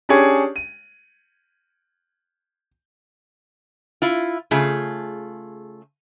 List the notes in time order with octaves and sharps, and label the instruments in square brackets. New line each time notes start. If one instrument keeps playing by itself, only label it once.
[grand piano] C#4 D4 G4 G#4 C#5
D#7
[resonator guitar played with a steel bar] E4 F4
C#3 A3 F4 G#4